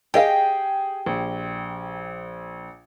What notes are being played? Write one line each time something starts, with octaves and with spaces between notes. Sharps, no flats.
G4 G#4 D#5 F5 G5
A#1